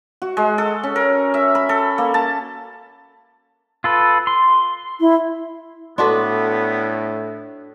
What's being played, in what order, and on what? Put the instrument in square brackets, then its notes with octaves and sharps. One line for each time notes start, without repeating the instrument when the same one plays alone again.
[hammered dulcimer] F#4
G#3
A4
C#4
A#4
E5
B5
A4
A#3
A5
[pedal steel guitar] F4 A4 B4
C6
[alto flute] E4
[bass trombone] A2 [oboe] B3 [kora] D4 F#4 B4 [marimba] A4 C6